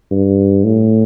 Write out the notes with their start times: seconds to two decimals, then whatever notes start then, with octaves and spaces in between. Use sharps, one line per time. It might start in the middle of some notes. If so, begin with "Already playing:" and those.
0.11 G2
0.64 A2